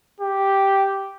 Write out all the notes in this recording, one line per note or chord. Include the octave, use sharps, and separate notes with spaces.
G4